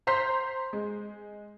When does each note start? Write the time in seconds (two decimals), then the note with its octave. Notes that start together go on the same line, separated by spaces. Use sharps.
0.07 C5 A#5 C6 G6 B6 C7
0.73 G#3